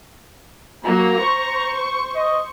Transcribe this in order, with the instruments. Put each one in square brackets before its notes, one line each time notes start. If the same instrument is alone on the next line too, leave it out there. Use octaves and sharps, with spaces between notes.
[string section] F#3 A#3 [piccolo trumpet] A#5
[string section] C5 C#6
[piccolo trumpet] D#5